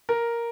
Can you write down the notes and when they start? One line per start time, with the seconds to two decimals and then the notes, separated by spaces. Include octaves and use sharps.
0.09 A#4